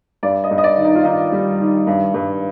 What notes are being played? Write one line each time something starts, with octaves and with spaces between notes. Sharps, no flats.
G2 D5
D#5
G2
D#5
D5
D#3
D#4
F4
D#3 D#4
G3
D#3
G2
G2